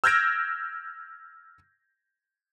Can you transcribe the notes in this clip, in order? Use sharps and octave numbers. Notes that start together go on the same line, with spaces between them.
E6 F6 G6 G#6 A#6 D7